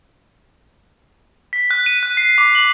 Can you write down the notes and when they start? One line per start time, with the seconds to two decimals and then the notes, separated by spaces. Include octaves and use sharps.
1.53 B6
1.71 F#6
1.86 D#7
2.03 F#6
2.17 C7
2.38 D6
2.55 F#7